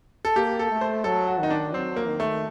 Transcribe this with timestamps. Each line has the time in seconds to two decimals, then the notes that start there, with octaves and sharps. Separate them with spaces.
0.25 A4
0.36 A#3 G4
0.59 A4
0.71 A3
0.81 C5
1.04 F#3 A4
1.27 F#4
1.40 D#3 D#4
1.50 D4
1.73 F#3 C4
1.96 A#3
2.08 D#3
2.20 A3